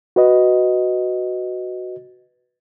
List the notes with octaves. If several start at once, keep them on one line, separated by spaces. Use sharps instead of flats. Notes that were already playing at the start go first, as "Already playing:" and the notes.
F#4 B4 D#5